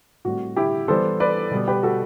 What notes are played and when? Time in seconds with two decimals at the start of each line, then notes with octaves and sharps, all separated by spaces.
0.25 A2 G3 C4 F#4
0.56 E4 G4
0.88 E3 G3 B3 A4 C5
1.20 B4 D5
1.51 B2 G3 B3
1.68 G4 B4
1.83 F#4 A4